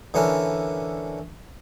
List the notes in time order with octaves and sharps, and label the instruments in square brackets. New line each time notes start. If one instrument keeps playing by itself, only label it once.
[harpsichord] D3 E3 C#4 D4 A#4